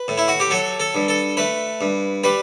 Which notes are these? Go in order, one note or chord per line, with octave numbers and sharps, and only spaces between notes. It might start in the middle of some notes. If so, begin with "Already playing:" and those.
Already playing: B4
A2
E4
F#4
G4
F#3 A4
A4
G2
A4
A3 B4
G2
G3 B4